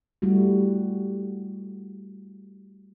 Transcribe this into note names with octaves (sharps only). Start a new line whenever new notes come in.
G3 A3 E4 F#4